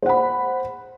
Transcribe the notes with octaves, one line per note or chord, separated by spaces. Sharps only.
C5 F#5 B5